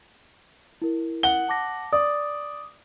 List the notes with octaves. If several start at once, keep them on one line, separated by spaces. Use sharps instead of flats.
E4 A#4
F#5 G7
A5 D6 A#6
D5 D6 D#6